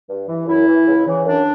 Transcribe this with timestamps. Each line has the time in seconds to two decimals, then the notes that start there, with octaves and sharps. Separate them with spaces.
0.09 G2
0.28 E3
0.47 F#2 E4
0.66 E3
0.87 C#2
1.06 C#3 E3
1.25 F#2 D4